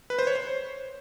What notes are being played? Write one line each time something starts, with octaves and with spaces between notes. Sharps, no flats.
B4
C5
C#5
C5